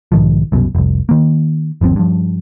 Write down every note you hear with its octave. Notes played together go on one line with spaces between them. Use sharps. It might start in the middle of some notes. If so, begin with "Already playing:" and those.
B1 G#2 D#3 F3
C2 F#2 B2
F1 C2
D#3 A#3
G1 D#2 F3 C4
G2 F3